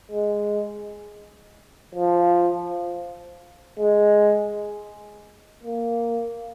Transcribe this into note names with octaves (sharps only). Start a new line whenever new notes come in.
G#3
F3
G#3
A#3